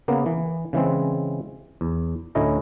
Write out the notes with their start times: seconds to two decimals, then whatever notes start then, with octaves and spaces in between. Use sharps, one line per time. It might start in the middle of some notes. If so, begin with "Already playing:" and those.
0.08 C#3 A#3 B3
0.26 E3
0.73 C#3 E3 G#3 C4
1.81 E2
2.35 D2 A2 C#4 E4 D#5 A#5